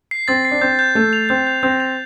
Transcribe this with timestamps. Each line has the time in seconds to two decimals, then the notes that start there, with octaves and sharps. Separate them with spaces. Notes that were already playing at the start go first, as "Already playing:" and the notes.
0.11 C7
0.28 C4 A6
0.45 C7
0.51 D4
0.61 C4 G6
0.79 G6
0.95 A3 G6
1.13 F7
1.29 C4 G6
1.47 G6
1.63 C4 G6
1.80 F7